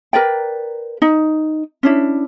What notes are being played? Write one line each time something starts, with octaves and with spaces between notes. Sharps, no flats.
A#4 B4 D5 G5
D#4
C#4 D4 E4